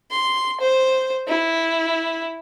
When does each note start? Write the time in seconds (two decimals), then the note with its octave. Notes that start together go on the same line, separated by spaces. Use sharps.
0.11 C6
0.60 C5
1.27 E4